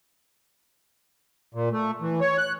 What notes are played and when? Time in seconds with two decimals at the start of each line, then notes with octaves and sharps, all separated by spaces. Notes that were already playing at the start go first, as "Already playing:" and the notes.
1.54 A#2
1.72 A3
2.01 E3
2.20 C#5
2.38 F#6